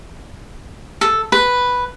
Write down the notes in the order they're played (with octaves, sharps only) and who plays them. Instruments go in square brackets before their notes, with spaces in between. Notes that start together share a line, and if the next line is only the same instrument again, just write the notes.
[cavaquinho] A4
B4